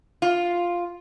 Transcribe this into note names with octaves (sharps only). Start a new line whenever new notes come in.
F4